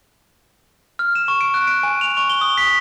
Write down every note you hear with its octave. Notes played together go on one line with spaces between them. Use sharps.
F6
E7
C#6
D7
F#6
D7
G#5
F7
C#6
G7
D#6
B6